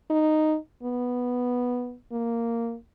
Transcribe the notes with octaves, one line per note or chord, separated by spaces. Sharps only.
D#4
B3
A#3